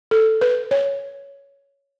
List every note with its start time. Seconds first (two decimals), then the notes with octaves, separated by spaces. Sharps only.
0.11 A4
0.41 B4
0.71 C#5